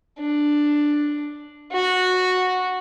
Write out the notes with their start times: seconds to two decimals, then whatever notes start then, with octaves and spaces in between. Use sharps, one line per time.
0.19 D4
1.72 F#4